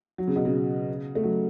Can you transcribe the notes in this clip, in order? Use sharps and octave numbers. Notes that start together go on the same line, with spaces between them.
F#3
C#3
B2
C#3
A3
F#3